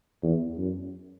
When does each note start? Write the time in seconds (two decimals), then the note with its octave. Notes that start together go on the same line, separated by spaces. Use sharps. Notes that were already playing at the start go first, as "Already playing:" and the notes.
0.23 E2
0.58 F#2